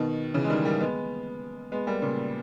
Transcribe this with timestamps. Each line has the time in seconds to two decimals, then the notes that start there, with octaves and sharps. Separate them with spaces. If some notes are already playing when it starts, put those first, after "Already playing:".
Already playing: B2 D#3
0.34 C#3 E3
0.44 G#3
0.50 D#3 G3
0.65 G3 A#3
0.80 G#3 B3
1.72 G#3 B3
1.87 G3 A#3
2.02 A#2 C#3